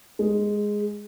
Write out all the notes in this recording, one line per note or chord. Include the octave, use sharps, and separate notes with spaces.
G#3